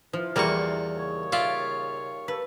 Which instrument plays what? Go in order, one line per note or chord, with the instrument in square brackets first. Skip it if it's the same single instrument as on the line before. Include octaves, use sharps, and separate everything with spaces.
[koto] F3 [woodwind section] E4 F4
[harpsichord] E2 C#6 [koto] G3 A#3 F#4
[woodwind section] D#2 C#3 C#5
[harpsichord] F4 [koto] D5 E5
[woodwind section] A#3 G4 A4 [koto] B4